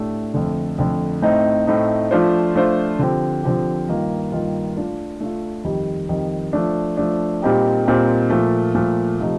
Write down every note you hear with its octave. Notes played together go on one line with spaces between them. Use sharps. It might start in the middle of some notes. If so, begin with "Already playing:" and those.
Already playing: A2 A3 D4 G4
F2 D3 A3
F2 D3 A3
A2 A3 C4 D#4
A2 A3 C4 D#4
F3 A3 D4 F4 C5
F3 A3 D4 F4 C5
D3 F3 C4 G4
D3 F3 C4 G4
G2 D#3 A#3 F4
G2 D#3 A#3 F4
A3 D4 F4
A3 D4 F4
F2 D#3 G3
F2 D#3 G3
F3 A3 D4
F3 A3 D4
A#2 G3 C4 D#4 G4
A#2 G3 C4 D#4 G4
A#2 F3 A3
A#2 F3 A3
C3 F3 A3 D#4